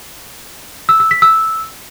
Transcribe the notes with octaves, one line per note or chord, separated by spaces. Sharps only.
E6
E6
B6
E6